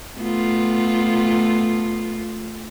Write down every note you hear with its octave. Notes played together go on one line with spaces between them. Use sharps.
A3 B3 F4